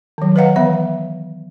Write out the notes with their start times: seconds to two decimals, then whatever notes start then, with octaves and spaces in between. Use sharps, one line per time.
0.18 D#3 F#3
0.36 B4 C#5 D#5 F5 F#5 A#5
0.56 E3 B3 E5